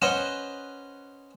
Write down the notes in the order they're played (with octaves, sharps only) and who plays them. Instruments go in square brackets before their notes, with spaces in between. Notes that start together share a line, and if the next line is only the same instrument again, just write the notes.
[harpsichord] C#4 B4 C5 D#5 F#5